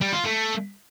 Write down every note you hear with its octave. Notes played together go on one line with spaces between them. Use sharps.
G3
F4
A3